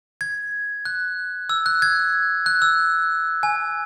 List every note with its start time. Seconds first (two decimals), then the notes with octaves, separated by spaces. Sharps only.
0.21 G#6
0.85 F#6
1.49 E6
1.66 F#6
1.82 G#6
2.46 F#6
2.62 E6
3.43 G#5